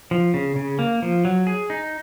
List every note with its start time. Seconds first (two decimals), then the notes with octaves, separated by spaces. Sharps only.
0.11 F3
0.34 C#3
0.56 C#3
0.79 A#3
1.02 F3
1.25 F#3
1.47 G#4
1.70 D#4